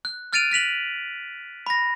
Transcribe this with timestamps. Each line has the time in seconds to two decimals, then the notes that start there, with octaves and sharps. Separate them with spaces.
0.05 F#6
0.33 F6 F#6 A6 D7 D#7 F7
0.51 F#6 B6 F7 F#7
1.66 B5 A#6